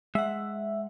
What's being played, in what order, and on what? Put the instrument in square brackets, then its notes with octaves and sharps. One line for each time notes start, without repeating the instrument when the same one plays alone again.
[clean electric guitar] G#3 F#5 [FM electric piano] E5